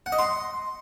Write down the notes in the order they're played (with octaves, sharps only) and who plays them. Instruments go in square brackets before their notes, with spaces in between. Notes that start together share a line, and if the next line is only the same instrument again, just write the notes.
[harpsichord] F#5
D#5
C6